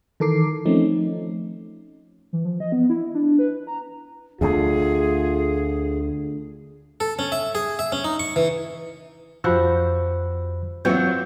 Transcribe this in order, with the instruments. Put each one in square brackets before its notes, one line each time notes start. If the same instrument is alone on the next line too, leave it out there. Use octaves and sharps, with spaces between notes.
[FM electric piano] D#3 E3 A4 A#4 D6 C7
F3 A3 C4 C#4 D#4
[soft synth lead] E3
F3
D#5
B3
E4
D4
B4
A#5
[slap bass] D2 A3 [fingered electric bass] D3 [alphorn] F4 [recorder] G#4
[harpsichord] A4
C#4
E5
G#4
E5
C#4
D#4
C#6
E3
[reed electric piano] F2 B5 E6 [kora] F3 F#4 G4
[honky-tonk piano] E3 C4 [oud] F#3 [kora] F4 C#5 E5 [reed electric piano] G6